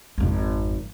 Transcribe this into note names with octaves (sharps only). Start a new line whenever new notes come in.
G#1 F2